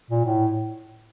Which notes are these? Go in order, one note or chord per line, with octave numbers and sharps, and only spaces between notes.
A#2
A2